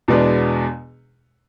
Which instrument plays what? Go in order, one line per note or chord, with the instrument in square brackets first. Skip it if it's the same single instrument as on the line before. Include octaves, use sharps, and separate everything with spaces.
[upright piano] E2 B2 G#3 B3 D4